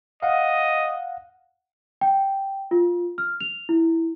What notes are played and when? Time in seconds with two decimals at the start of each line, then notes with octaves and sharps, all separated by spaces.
0.23 D#5 F5 F#5
2.01 G5
2.71 F4
3.18 F6
3.41 F7
3.69 E4